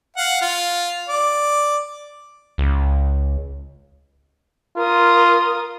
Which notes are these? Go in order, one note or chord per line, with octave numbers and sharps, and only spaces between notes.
F5 F#5
F4
D5
C#2
F4 A#4 D#6